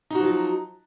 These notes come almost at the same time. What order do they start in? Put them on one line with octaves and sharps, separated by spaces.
D#4 F#4 F3 F#3